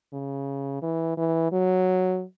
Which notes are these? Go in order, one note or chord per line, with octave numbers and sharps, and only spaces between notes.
C#3
E3
E3
F#3